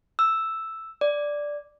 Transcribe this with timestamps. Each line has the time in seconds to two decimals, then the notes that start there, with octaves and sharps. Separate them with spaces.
0.19 E6
1.01 D5